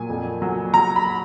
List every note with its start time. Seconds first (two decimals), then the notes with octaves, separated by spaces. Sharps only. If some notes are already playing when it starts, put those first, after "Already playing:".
Already playing: A#2 F#3 G#5
0.09 F2
0.42 F#3
0.74 F#3 A#5
0.96 B5